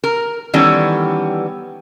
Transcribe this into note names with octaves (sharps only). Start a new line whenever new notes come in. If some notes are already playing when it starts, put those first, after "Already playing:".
A#4
D#3 E3 G3 B3 C#4 A4